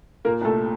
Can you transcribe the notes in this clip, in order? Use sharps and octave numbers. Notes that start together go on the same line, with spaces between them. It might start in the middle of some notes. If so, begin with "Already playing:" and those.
A#2 A#3 A#4
C2 A3 A4